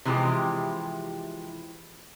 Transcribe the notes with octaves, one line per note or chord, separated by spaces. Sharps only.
C3 E3 F3 G#3 G4